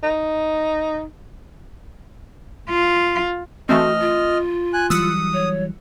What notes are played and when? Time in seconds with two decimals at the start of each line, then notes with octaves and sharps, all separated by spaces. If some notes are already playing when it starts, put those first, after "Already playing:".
0.03 D#4
2.69 F4
3.69 E3 A3 C4 F#4 D#5 F6
4.00 F4
4.74 G#5 F#6
4.90 E3 F#3 G3 D#6 E6 F#6 C#7
5.33 C#5